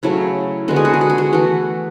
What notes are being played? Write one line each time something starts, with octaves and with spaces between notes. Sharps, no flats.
C#3 F#3 A3 E4
D3 G#3 B3 F#4
G#4
F#4
G#4
F#4
G#4
F#4
E3 A3 F#4